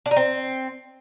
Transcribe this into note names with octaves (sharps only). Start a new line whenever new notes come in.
D4
D#4
C4